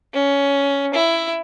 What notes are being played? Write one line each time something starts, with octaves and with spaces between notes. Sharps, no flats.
C#4
E4